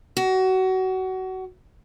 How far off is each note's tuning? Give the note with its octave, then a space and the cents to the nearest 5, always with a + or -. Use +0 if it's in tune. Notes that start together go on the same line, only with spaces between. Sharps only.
F#4 +25